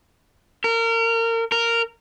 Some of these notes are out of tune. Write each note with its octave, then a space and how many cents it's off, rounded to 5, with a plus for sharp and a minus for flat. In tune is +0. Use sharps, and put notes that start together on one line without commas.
A#4 -30
A#4 -10